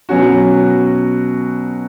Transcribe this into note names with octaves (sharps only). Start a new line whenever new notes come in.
B2 F#3 C#4 F#4